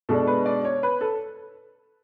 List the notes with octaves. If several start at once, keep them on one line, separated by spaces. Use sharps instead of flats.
B2 G#3 D4 A4
B4
D5
C#5
B4
A4